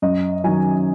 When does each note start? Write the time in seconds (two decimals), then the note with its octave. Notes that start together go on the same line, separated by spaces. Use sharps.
0.02 F#2 D#5
0.44 D#3 F#3 G#5